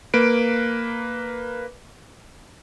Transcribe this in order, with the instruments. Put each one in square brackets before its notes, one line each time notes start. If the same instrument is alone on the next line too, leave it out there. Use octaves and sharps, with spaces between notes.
[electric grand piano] A#3 B4 D7